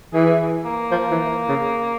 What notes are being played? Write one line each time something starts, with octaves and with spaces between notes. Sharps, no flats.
E3 G#4
A#3
F3
E3
C#3